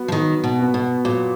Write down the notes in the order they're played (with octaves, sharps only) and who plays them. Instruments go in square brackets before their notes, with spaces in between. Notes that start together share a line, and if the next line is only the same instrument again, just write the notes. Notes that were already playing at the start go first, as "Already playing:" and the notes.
Already playing: [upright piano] F#3 B3 F#4
[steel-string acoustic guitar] F3
[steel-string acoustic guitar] D#3 [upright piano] F#3
[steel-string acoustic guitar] B2
[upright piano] B3 F#4
[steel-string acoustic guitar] B2
[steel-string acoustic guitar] A#2 [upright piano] F#3